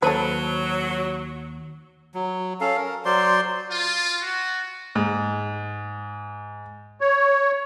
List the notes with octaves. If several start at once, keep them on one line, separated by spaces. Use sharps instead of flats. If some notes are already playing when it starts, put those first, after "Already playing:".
D#2 F#3 A4 B4 C5 A5
F#3
C#4 A4 F5
A#4
F#3 C5 D5 C6
F4
F#4
G#2
C#5